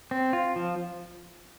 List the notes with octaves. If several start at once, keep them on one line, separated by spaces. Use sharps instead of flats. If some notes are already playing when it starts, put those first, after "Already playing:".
C4
F4
F3